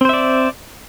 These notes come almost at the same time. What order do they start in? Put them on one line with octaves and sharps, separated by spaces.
C4 C5 E5 D5